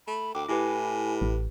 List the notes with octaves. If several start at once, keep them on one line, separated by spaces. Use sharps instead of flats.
A3 B5
D2 G5 D6
A2 E4 G4 B4 G#5
A1